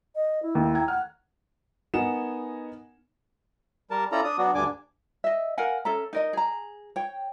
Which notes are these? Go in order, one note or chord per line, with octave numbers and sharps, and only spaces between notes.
D#5
E4
D#2
G5 A#5 G#6
F#5 F6
B3 D#4 A#4 F#5 G#5 E7
G3 A#4 A5
C#4 E4 F4 A4 D5 A#5
D4 D#6
F#3 B3 D4 F#4
D2 G2 D3 D4 G#5 D6
D#5 E5
A#4 F5 F#5 G#5
C#4 A4 E5 A#5
D#4 A#4 D#5
G#4 A#5
C#5 G5